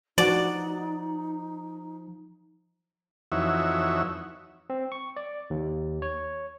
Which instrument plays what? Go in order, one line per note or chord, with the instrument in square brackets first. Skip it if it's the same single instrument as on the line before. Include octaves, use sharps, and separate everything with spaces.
[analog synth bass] F3 [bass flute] D#4 [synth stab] F#4 F#5 [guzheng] D5
[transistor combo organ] F2 E3 D#4 F#4 C#5 E5
[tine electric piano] C4
C#6
D5
D#2
C#5